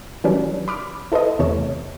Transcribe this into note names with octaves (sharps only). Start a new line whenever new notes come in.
D#3 E3 F#3 G3 C#4 D4
B5 D6 F6
E4 A4 B4 C5 D#5
E2 C3 E3 A3 C#5 E7